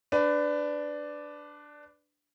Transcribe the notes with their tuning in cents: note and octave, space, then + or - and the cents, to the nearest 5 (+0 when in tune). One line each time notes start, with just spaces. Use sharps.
D4 +0 B4 +25